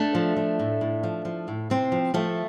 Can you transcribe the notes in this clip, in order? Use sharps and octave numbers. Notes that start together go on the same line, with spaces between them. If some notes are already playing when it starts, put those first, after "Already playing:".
Already playing: A3 D4
F3
F3
A2
A2
F3
F3
A2
C3 C4
F3
F3 A3